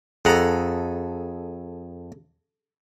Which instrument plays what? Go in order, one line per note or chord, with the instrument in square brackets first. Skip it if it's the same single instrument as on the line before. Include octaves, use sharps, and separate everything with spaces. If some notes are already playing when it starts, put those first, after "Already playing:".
[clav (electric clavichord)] F2 F#5 A#5 [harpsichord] G#4 A4